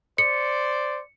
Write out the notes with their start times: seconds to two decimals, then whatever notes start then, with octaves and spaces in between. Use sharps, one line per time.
0.18 C5 D5 C#7